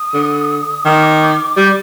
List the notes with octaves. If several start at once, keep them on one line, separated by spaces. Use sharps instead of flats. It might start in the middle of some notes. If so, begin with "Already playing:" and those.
Already playing: D#6
D3
D#3 D6
G3